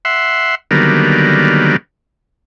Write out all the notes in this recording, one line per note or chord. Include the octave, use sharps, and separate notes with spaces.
E5 F#5 C6
D3 D#3 F#3 G3 A#3 B3